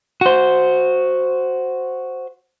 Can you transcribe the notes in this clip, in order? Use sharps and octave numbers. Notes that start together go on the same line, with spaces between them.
F#4 C5